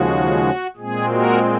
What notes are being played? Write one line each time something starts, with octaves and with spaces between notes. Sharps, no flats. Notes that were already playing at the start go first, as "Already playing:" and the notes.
Already playing: D#2 C#3 F3 G#3 F#4
A#2 G#3 C4 G#4
F#4 A#4